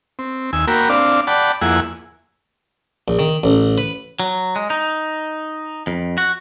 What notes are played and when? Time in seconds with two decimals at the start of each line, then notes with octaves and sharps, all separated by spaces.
0.19 C4
0.53 D#2 G#5 E6
0.68 A#3 F#4 A#4 G5 B5
0.89 C4 D4 D5 F5
1.27 D5 F#5 G5 A5 B5
1.61 F2 A#3 E4 G#4 F#5 G#5
3.08 A#1
3.19 D#3
3.44 A1
3.78 B4
4.20 F#3
4.56 G#3
4.70 D#4
5.87 F2
6.18 F#4